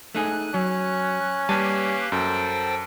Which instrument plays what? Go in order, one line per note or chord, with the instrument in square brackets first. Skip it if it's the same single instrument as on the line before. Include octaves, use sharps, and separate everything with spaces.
[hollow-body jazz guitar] A3 D#4 G#4 [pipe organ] F#6
[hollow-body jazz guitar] F#3 [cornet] C#4
[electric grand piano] G3 [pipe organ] A#3 G4 B4 [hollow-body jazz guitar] G#5 A5
[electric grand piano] F#2 [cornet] A4 [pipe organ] C5 G5